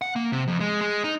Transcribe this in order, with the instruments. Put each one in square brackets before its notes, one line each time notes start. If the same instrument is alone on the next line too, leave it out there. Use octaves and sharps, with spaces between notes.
[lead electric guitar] F#5
A#3
C3
F2
G#3
G#3
D#4